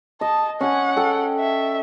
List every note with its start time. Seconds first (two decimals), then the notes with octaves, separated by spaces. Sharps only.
0.21 D#5 A5
0.61 C#4 F#5 G#5
0.97 A4 G5
1.39 E5